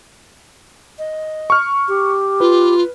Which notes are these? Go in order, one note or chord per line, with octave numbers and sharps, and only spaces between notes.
D#5
C#6 F6
G4
F4 B4